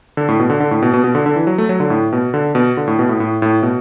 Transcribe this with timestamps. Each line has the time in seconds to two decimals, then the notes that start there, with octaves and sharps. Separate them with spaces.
0.17 D3
0.28 A2
0.40 B2
0.50 D3
0.60 D3
0.71 A2
0.82 B2
0.94 B2
1.04 B2
1.15 D3
1.26 D3
1.36 E3
1.47 F#3
1.58 A3
1.69 F#3
1.80 D3
1.90 A2
2.13 B2
2.34 D3
2.55 B2
2.77 D3
2.88 A2
2.99 B2
3.09 A2
3.20 A2
3.42 A2
3.63 B2